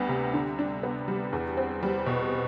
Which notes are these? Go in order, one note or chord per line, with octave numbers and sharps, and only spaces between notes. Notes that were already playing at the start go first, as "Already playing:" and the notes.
Already playing: D2 G3 B3
C3
D3
D4
B3
G3
E2
C4
G3
B2